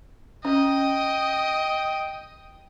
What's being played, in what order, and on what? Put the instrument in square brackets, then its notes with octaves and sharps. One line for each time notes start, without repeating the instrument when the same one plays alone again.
[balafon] C#4 [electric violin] D#5 [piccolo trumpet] G5